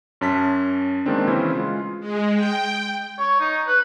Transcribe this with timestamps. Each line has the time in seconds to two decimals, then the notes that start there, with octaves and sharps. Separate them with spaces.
0.21 F#2 C#4 A5 B6
1.06 D#3 G#3 A#3 C4 D4
1.28 C#3 E3 C4 C#4 E4
1.55 G#3 F4
2.00 G#3
2.35 G5
3.18 C#5
3.41 D#4
3.68 B4